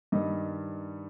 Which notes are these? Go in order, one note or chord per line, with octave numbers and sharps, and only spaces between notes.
G2 D#3 G3 D#5